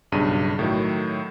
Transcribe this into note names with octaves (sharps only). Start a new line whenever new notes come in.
B1 G2 C#3 D#7
A2 D#3 F#3